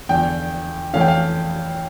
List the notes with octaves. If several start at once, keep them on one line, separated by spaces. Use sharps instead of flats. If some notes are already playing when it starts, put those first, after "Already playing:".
E2 D3 F3 G5
F2 E3 A3 C#4 F5
G5
F5